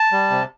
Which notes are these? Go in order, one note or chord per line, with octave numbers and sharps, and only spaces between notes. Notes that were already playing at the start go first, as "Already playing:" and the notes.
Already playing: A5
G3
C3